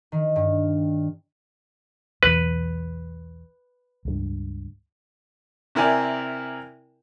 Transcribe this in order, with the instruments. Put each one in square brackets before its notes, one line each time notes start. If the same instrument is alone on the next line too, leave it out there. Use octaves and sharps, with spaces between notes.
[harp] D#3
G2
[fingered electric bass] B1 E2 [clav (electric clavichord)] B4
[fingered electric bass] C#2 G2
[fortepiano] C3 E4 A#4 D5 G#5